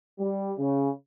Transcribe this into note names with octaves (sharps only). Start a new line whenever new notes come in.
G3
C#3